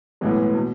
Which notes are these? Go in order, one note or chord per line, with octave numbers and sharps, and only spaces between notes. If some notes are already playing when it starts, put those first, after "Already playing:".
B1 A2 E3 G#3 B3
B2